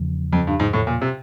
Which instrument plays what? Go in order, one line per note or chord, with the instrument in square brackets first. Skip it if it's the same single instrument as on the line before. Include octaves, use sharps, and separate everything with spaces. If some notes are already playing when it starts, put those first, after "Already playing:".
Already playing: [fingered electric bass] E2 C#3 F3
[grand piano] F2
G2
G#2
A2
A#2
C3